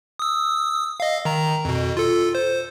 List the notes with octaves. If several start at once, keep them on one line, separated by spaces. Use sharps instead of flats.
D#6 E6
D#5 F5
D#3 A#5
F2 B2
F4 A4
C5